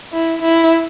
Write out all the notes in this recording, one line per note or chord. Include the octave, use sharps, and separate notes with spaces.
E4
E4